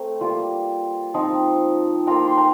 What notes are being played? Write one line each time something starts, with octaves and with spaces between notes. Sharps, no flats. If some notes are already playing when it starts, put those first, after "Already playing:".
Already playing: A3 C4 G5 A#5
G3 A#3 F4
F3 C4 D#4
A#3 F4 G5 A#5
C6
G5 A#5